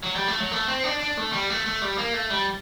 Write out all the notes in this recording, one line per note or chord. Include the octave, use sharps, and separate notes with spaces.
F#3
G3
A3
F#3
A3
C4
D4
D4
A3
G3
A3
A3
G3
A#3
A3
G3